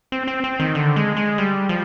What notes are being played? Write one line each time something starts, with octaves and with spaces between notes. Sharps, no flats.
C4
C4
C4
D#3
D3
G#3
G#3
G3
F3